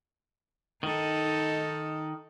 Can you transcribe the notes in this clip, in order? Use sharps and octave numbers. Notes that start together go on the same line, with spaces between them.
D#3 D#4 A4